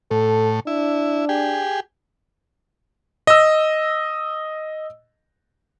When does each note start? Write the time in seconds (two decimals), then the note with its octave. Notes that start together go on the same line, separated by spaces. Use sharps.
0.11 A2 A4
0.67 D4 E4
1.29 G4 G#4
3.27 D#5 E6